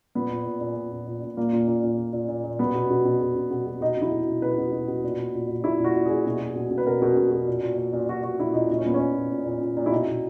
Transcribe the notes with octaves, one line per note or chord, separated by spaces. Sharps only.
A#2 B3
A#2
A#2
A#2
A#2
A#2
A#2
A#2
A#2 A#3
A#2
A#2
A#2
A#2
A#2
A#2
A#2
B2 B3
B2
B2
B2
B2
B2
B2
B2
B2 D#4
B2 E4
B2
B2
B2 B4
B2
B2
B2
A#2
A#2
A#2
A#2
A#2 E4
A#2 F#4
A#2
A#2 G#4
B2
B2
B2
B2
B4
B2 A#4
B2
B2
B2
A#2
A#2
A#2
A#2
A#2 F#4
A#2 F#4
A#2 E4
A#2 D#4
A#2 D#4
C#4
A#2 B3
C#4
A#2
A#2
A#2
A#2
A#2
A#2
E4
B2 D#4
B2